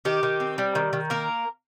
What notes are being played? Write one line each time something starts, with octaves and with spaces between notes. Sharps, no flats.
D#3 G4
D#3
C4
G3
D#3
D#3
A#3 A#4